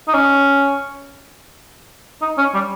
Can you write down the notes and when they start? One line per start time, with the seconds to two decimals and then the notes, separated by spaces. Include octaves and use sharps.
0.08 D#4
0.14 C#4
2.22 D#4
2.38 C#4
2.54 G3